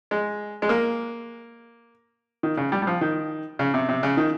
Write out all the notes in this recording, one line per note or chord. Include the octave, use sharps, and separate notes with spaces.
G#3
G#3
A#3
D#3
C#3
G3
G3
F3
D#3
C#3
C3
C3
C#3
D#3